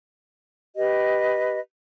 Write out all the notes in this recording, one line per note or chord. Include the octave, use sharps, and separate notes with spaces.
G4 B4 D#5